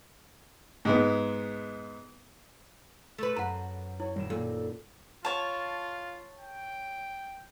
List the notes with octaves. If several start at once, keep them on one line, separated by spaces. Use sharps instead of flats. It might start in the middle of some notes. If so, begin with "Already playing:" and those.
G#2 G#3 B3
A3 B4
F#2 B4 F#5 A#5
E4 C#5
D#1 G3 E7
A#2 A4
F4 C#5 A5
G5